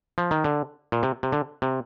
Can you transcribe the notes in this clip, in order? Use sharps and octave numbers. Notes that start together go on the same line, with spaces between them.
F3
D#3
D3
A#2
C3
C3
D3
C3